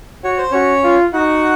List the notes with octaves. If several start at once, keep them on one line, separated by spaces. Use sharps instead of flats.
F#4 C#5
C5
C#4 F#4 C#5
F4
D#4 F#4 F#5